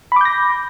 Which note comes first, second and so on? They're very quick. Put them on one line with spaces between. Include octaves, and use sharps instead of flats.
B5 D6 G6 A#6